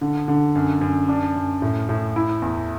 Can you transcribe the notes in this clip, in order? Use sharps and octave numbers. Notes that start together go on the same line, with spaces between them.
D3
D3
F#2
F#2
D4
F#2
A2
A2
E4
E2